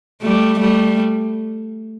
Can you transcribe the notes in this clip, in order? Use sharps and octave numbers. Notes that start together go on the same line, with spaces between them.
G3 A3
G3 A3